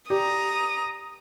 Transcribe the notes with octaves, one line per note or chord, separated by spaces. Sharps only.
G4 D5 A#5 D#6